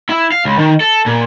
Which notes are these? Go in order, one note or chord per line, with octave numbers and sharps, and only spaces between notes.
E4
F5
C#2
D#3
A4
A#2